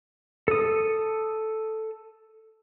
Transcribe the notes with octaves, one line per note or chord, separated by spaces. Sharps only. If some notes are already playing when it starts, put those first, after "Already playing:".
A4 D#6